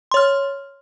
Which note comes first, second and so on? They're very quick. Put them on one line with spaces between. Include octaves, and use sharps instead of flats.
C6 C#5 F6